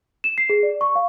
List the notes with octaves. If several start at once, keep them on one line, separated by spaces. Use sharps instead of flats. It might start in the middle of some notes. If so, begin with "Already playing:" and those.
E7
C7
G#4
D5
C#6
F5